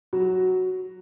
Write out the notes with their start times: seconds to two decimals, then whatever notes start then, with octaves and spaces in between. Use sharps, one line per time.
0.13 F#3 F#4